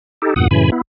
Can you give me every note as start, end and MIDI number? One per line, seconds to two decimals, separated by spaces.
0.22 0.34 63
0.22 0.34 67
0.22 0.34 69
0.36 0.48 40
0.36 0.48 43
0.36 0.48 46
0.36 0.48 78
0.36 0.48 87
0.51 0.70 42
0.51 0.70 45
0.51 0.70 49
0.51 0.70 52
0.51 0.70 80
0.51 0.70 83
0.72 0.81 59
0.72 0.81 64